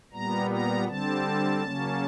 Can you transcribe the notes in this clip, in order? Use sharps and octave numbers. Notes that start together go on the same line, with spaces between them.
A#2 G3 B3 A#5
A#5
D3 G3 C4 A5
C#3 F#3 A#3 C#4